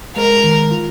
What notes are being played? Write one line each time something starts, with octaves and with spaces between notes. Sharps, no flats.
G#3 A#4
D#3
F4